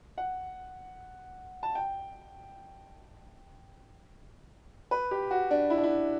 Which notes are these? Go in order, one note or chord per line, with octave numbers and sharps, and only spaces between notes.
F#5
A5
G5
B4
G4
F#4
D4
E4
D4
E4